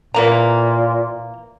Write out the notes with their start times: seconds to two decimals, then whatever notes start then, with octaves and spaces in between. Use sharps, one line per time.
0.14 A#2 E3 A#3 A#5